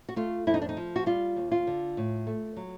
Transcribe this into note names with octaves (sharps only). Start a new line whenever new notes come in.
F#4
A3 F4
F2 E4
D#4
D4
D#4
F3
F#4
G3 F4
D#2
F4
D3
A2
A3
F#3